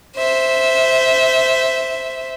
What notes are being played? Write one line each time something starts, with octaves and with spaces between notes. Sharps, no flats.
C5 E5